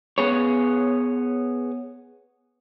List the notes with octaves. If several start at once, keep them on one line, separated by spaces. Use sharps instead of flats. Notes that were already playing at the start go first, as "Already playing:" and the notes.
B3 G#4 C#5